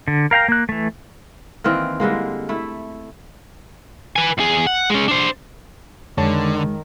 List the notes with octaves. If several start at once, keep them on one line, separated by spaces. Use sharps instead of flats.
D3
A#4 F5 G5 A#5
A#3 F#6
E3 A3
D#3 E3 A#3 C4
D3 G3 G#3 A#3
A3 E4
B4 G#5
E2 G#4
F#5
G#3 C#4
D4 C5
F2 D3 D#3 G#3 C#5 A5